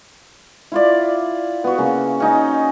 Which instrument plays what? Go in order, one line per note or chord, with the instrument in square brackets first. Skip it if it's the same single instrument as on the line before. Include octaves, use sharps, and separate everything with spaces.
[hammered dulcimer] E4 F4 D5
B3 F#4
C#3 A#3
C#4 D#4 D#5